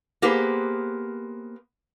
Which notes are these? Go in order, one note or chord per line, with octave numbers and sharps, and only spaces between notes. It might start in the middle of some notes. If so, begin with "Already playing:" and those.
A#3 B3 G4 G#4 B4 C5